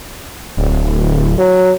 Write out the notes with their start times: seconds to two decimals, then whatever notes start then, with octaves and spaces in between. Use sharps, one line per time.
0.57 D1
1.38 F#3